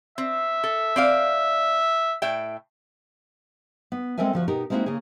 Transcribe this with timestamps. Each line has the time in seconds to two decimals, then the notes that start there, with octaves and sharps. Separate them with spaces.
0.18 C4 E5
0.64 A4
0.96 C4 D5 F5
2.22 A2 E5 G5
3.92 B3
4.18 G#3 C4 A4 A#4 E5 G#5
4.33 D2 F3 F#4
4.48 B2 D#4 G4 A#4
4.70 G#3 A#3 C4 D#4 E4 F#4
4.86 C#3 A#3 G#4